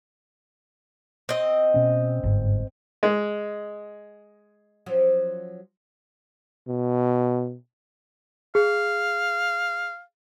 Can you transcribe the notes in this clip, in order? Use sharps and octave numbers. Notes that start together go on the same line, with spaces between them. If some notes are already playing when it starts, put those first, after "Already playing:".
C4 D#5
B2 B3 C#4
G1 G#2
G#3
F3 F#3 C#4
B2
G#4 F5